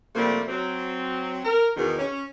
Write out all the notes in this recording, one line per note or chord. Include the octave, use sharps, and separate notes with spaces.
C3 F3 G3 A3 A#3 C4
F#3 C4
A#4
E2 B2 D#3
C#4